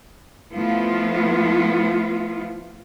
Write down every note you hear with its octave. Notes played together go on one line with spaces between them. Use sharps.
F3 A3 B3 E4 F4